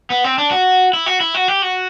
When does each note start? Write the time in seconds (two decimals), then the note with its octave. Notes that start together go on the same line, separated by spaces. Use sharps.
0.10 B3
0.24 C4
0.38 D4
0.51 F#4
0.93 E4
1.06 F#4
1.20 E4
1.34 F#4
1.48 G4
1.62 F#4